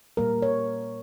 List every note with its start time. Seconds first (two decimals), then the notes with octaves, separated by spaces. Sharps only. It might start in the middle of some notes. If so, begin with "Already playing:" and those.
0.17 A#2 G3 A#3 A#4
0.42 C#5